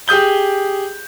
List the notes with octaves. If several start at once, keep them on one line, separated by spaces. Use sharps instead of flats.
G4 G#4 D#6 G6 G7